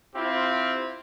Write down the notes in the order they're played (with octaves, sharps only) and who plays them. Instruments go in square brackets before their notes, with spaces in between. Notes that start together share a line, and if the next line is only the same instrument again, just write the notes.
[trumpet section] C4 E4 F4 G4